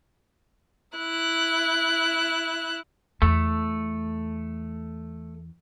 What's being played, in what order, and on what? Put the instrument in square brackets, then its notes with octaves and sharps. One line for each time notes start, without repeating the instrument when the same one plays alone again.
[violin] E4 F#6
[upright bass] E2 [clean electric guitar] A3